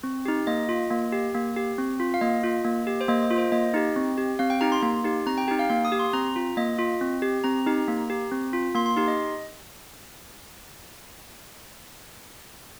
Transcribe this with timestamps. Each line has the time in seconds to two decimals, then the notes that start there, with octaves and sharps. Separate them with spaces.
0.03 C4
0.26 D#4 G4
0.47 A#3 D#5
0.69 F4
0.91 A#3
1.12 G4
1.35 A#3
1.57 G4
1.78 C4
2.00 F4
2.14 F5
2.21 A#3 D#5
2.44 F4
2.65 A#3
2.87 G4
3.01 C5
3.08 A#3 D#5
3.23 D#5
3.30 F4
3.38 C5
3.52 A#3 D#5
3.74 D#4 G4
3.96 C4
4.18 G4
4.39 C4 F5
4.50 G5
4.61 D#4 G4 A#5
4.72 C6
4.82 A#3 C6
5.04 D#4 G4
5.26 C4 A#5
5.38 G5
5.48 D#4 G4 G5
5.59 F5
5.70 A#3 F5
5.85 D#6
5.92 G4
5.99 C6
6.13 C4 A#5
6.36 F4
6.57 A#3 D#5
6.79 F4
7.01 C4
7.22 G4
7.44 C4 A#5
7.66 D#4 G4
7.88 A#3
8.10 G4
8.31 C4
8.53 F4
8.75 A#3 C6
8.86 C6
8.96 D#4 G4 C6
9.08 D#5